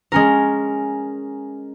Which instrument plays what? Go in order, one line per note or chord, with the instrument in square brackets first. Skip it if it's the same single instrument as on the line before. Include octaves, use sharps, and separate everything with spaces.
[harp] G#3 C#4 A#4